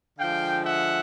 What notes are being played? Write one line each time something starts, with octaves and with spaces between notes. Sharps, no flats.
D3 F3 G#3 F5 G5
E5 F#5